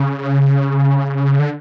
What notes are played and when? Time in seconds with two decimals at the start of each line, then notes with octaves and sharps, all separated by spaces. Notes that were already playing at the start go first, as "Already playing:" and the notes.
Already playing: C#3
1.39 D3